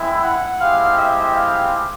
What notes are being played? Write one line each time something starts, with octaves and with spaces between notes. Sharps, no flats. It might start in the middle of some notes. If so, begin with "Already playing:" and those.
Already playing: G#3 C4 E4
F#5
G#3 C4 E4 G4 F5
E5
F5